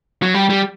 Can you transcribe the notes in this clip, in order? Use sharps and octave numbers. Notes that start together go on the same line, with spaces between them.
F#3
G3
G3